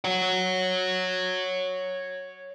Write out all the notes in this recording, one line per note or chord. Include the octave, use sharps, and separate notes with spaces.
C#5 F#5